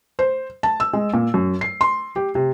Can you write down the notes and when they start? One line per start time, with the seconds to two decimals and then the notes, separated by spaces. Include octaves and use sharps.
0.19 C5
0.63 A5
0.80 E6
0.93 G#3
1.14 A#2
1.34 F#2
1.61 C7
1.81 C6
2.16 G4
2.35 C3